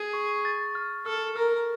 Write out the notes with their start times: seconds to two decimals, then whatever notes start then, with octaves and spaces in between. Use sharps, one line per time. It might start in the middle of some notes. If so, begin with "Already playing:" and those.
Already playing: G#4
0.13 C#6
0.45 A6
0.75 F6
1.06 A4 F6
1.36 A#4 F6